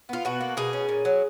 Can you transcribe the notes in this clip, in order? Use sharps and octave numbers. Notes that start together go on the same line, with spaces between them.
B3 F4
B2 F#4
A#3
B2 G#4
C#4
A#2
F#3